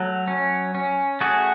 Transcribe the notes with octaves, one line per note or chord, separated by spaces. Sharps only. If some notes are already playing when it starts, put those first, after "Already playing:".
Already playing: F#3 A3
C#4
C#4
A3 F#4 G#4